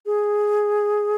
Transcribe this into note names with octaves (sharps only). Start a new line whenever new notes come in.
G#4